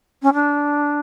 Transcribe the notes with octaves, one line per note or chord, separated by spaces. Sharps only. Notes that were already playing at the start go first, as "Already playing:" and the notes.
C#4
D4